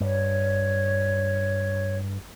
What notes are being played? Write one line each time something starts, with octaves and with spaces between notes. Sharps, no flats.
G2 C#5